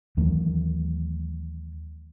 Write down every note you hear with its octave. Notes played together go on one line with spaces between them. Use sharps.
D#2 E3 F#3 A3